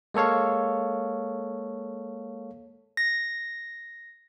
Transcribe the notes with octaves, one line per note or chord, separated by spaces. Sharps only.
G#3 A#3 A4 C#5 F5
A#6